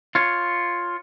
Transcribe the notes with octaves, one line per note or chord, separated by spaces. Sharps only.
F4 C#5